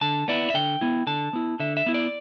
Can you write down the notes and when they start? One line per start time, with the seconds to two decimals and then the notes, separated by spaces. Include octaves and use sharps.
0.01 D3 A5
0.28 B3 E4 D5
0.50 E5
0.54 D3 G5
0.81 B3 E4
1.07 D3 A5
1.33 B3 E4
1.60 D3 E5
1.77 E5
1.86 B3 E4
1.94 D5